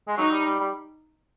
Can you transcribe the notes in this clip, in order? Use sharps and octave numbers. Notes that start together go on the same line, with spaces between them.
G#3
F#3 D#4
G3
G3
G3